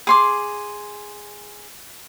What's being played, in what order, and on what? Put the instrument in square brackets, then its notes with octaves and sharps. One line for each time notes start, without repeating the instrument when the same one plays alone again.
[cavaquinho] G#4 C6 D6